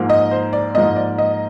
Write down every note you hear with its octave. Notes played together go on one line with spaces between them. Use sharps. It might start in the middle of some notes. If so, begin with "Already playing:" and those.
Already playing: G#2 F3 A#3
D#5
C5
D5
G#2 F3 A#3 D#5
D5
D#5